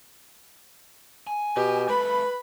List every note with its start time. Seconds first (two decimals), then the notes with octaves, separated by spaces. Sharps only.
1.27 G#5
1.56 B2 G4
1.89 G#3 A4 B4 B5